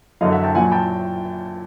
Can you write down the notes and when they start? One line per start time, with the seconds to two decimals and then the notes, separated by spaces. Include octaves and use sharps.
0.21 F#2 D3 F#3 D#5 F5
0.32 E5 F#5
0.43 G5 A5
0.55 A#2 F#3 F#5 G#5
0.72 G5 A5